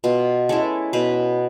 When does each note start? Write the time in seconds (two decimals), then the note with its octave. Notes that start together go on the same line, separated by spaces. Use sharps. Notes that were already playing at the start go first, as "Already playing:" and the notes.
0.04 B2 F4
0.49 G#3 C#4 E4 A4
0.93 B2 B4